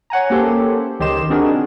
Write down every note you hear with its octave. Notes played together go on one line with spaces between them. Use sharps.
C#5 F#5 G#5 A#5
A#3 C#4 G4 A4 C5
C#2 D#3 G4 D#5 C6 E7
C4 D4 D#4 F#4 G#4 A#4